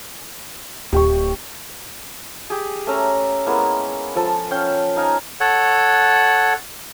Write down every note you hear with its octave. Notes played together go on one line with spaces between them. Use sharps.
D1 G4 G5 C#6
G4 G#4
A3 C#4 E5 A#5
G#3 A#3 B3 E4
F3 A4
C#4 F5 G5
D#4 F5 G#5
A4 C#5 F#5